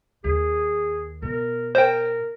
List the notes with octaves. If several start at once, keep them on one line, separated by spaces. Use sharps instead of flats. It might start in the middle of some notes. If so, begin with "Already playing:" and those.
D#2 G#4
B2 A#4
A#4 C5 G5